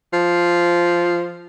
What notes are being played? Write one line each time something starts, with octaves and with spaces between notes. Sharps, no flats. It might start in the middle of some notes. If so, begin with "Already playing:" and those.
F3